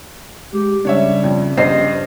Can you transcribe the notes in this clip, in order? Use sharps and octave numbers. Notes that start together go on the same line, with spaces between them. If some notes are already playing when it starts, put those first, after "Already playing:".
G#3 G4
C#3 G3 D4 C#5 E5
F2
G2 C#3 C5 D#5 C7